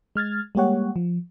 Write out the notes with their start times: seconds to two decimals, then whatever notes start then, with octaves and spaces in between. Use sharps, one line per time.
0.15 G#3 F6 G#6 A6
0.55 G3 G#3 A#3 G4 C#5 F#5
0.96 F3